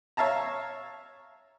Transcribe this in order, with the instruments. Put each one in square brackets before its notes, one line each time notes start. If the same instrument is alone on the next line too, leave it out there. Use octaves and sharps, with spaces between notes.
[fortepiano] C#5 E5 F5 A5 A#5